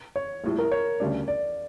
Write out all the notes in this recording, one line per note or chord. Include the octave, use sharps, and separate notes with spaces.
C#5
A#1 A2 G3
A#4
C#5
D2 C#3 G3 D4
D5